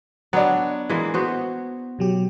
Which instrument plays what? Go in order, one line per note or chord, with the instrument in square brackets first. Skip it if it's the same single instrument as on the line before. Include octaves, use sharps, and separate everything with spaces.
[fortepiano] F#3 D4 [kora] B3
[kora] E3 G#3 A#3
B3 F#4 C5
[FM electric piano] B2 F#3 G4